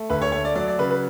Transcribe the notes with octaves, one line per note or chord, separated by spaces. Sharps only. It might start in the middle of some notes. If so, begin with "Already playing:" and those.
Already playing: A3
D2 B4
C#5
A3 C#5
D5
F#3 D5
D5
C#3 B4
B4